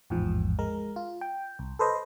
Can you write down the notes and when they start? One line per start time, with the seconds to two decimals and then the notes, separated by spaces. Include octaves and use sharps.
0.10 A1 E2 G#2 F3
0.59 G#3 A#4
0.96 F4
1.21 G5
1.59 C2
1.79 A4 B4 C5 D#5